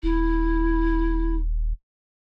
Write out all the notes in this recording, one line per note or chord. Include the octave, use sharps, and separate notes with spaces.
D#1 E4